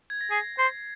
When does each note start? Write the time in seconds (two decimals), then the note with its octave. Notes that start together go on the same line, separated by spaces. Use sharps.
0.10 G#6
0.21 A#6
0.31 G#4 C7
0.59 C5